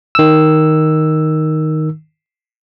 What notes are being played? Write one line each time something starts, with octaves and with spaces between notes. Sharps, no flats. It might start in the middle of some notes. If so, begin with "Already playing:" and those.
D#3 E6